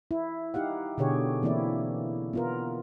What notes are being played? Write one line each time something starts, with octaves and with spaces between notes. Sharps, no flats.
E4
D#4 G4 F5 F#5
B2 D3 G4 G#4 C#5
E3 A#3 C4 E4 D5
B3 F4 A#4